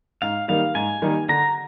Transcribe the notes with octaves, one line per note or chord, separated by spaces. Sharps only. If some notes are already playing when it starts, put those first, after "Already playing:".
G#2 F5
D#3 G3 A#3 D#4 F5
G#2 G#5
D#3 G3 A#3 D#4
D3 A#5